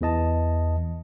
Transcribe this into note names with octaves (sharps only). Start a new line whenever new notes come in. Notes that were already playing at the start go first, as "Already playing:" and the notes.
E2 E3 D#5 A5